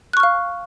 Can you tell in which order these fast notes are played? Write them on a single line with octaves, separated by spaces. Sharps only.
F#6 C#6 F6 F5